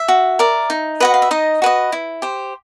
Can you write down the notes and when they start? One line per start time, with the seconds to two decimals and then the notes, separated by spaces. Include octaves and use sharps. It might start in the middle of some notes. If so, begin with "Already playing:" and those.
Already playing: E5
0.08 F#4
0.39 A#4 D5
0.70 D#4
1.00 F#4 B4 D#5 F#5
1.14 F5
1.22 E5
1.31 D#4 D#5
1.62 F#4 B4 D#5
1.92 E4
2.22 G4 C5